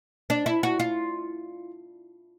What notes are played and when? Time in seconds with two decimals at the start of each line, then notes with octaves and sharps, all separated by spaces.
0.30 D4
0.46 E4
0.63 F#4
0.80 F4